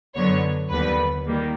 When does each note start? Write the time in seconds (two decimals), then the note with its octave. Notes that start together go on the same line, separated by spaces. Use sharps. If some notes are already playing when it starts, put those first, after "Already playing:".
0.15 F#2 D3 F#3 B3 C#5
0.70 D#2 D3 G3 B3 B4
1.26 D#3 G3 A#3